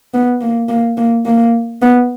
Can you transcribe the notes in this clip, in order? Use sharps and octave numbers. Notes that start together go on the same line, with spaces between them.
B3
A#3
A#3
A#3
A#3
B3